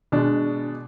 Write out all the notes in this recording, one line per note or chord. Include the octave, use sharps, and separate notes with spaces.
B2 G#3 D4